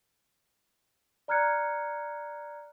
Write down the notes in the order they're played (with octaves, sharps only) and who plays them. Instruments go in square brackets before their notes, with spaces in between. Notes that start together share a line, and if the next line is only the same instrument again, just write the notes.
[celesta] D5 A#5 F6 F#6 G#6 C#7